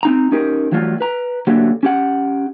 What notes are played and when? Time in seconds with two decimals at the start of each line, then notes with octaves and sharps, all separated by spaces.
0.03 C4 D#4 A#5
0.32 C#4 D#4 G4 A#4
0.72 E3 F#3 G3 A3 F4
1.01 B4 A#5
1.47 D3 F#3 A3 A#3 G4
1.83 C#4 G4 F#5